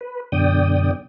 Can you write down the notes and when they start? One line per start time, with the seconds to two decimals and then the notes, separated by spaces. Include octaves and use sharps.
0.01 B4
0.32 F#2 B2 D3 D5 G5 D#6